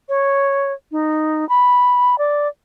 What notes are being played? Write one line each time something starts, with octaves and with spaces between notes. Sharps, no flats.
C#5
D#4
B5
D5